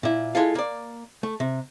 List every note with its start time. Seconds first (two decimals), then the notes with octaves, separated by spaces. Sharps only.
0.03 A#2 E4
0.35 G#3 E4 F4 A4 F5
0.55 A#3 D5
1.23 A3
1.40 C3